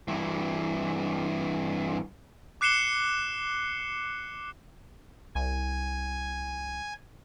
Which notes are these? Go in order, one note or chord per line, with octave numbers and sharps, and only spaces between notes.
G2 E3
D6 F#6 C7 C#7 E7 G7
C2 G#5